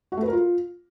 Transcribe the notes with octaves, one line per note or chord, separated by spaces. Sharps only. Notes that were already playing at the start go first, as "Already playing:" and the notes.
F#4
A3
B4
A#4
F4